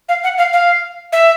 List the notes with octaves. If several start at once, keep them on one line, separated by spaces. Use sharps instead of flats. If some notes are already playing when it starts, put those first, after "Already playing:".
F5
F#5
F5
F5
E5